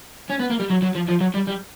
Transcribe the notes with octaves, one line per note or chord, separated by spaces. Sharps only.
C#4
B3
A#3
G3
F#3
F#3
F3
F3
F#3
G3
G3